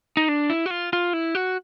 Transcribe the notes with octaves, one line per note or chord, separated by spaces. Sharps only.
D#4
D4
E4
F#4
F4
F4
E4
F#4